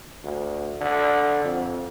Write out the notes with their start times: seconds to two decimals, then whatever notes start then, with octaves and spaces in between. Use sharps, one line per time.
0.23 D2
0.81 D3
1.44 F2